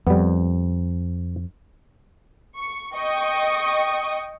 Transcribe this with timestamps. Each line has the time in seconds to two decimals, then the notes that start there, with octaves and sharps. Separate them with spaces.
0.07 F2 G3 B3
2.56 C#6
2.94 D#5 G5 C#6 D#6